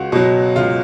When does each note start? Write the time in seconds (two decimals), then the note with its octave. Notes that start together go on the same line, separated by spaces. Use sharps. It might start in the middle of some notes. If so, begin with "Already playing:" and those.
Already playing: C#2 F#4
0.12 B2 F#3
0.56 C#2 F4